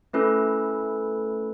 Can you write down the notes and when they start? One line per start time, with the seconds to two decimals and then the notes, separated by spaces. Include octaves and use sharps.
0.13 A3 C#4 E4 A4 B4